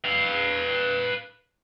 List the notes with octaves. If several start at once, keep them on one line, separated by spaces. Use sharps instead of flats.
B4 F5